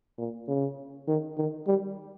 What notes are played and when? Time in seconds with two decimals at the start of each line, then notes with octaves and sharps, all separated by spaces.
0.18 A#2
0.48 C#3
1.07 D#3
1.37 D#3
1.67 G3